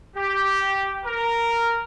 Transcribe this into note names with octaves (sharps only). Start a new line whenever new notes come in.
G4
A#4